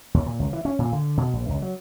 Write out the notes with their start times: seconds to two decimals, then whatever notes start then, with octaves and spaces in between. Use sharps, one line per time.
0.14 D#2
0.26 A#2
0.39 C#2
0.53 E3
0.65 C#4
0.79 A#2
0.93 D3
1.17 B2
1.33 A#1
1.49 C#2
1.62 F#3